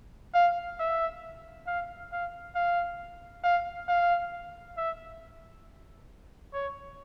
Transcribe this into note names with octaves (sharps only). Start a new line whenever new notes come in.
F5
E5
F5
F5
F5
F5
F5
E5
C#5